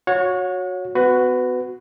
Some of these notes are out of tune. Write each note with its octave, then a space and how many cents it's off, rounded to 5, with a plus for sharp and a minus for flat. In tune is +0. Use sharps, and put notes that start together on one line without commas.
F#4 -15 C#5 +0 F#5 -40
B3 +40 F#4 +0 B4 +20